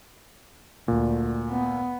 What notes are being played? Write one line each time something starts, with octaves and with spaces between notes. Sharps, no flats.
D2 A#2
B3